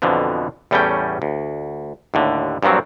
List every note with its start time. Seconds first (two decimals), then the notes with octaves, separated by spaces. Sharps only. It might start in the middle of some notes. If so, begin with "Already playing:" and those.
0.02 F2 B2 D3 E3 F3
0.71 E2 A2 G3 A3 C#4 G5
1.22 D2
2.14 D#2 A2 D3
2.63 G2 A#2 F3 F#3 C4